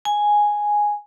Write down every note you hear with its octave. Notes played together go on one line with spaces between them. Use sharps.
G#5